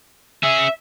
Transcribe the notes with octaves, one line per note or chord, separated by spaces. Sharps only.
C#4 G#4 E5